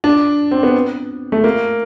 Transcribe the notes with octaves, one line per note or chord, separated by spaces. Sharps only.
D4
C4
B3
A3
A#3